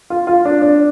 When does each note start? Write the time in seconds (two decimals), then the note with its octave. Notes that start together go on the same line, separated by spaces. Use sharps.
0.10 F4
0.27 F4
0.45 D4
0.62 D4